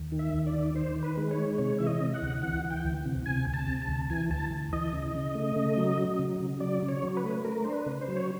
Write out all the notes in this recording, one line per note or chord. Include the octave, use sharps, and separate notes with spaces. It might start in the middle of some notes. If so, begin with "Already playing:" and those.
Already playing: D#2
D#3
E5
D#2
D5
D#3
D#3 C5
D#3
B4
G#3
C#5
G#3
C3 C#5
E3 E5
D#5
C3
F#5
D2
E3 F#5
E3
G5
D2
C3
C3 G#5
D2
A5
C3
A5
D2
E3 G#5
D2 A5
D2
E3 D#5
C#3
C#3
A3
C#3
F#3
F#3
C#3
C#3
F#3 D5
C#3
C#5
F#3
B4
A3
A3 A#4
D4 C5
B4
C#3
C5
F#3
C#5